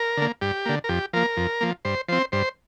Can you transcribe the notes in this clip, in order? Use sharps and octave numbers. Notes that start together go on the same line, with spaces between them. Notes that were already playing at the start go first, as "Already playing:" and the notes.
Already playing: A#4
D3 A#3
G2 G4
D3 A#3
A#4
F2 G4
F3 A#3 A#4
F2
F3 A#3
G2 C5
F3 C4 C5
G2 C5